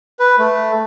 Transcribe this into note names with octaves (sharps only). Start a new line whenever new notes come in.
B4
A3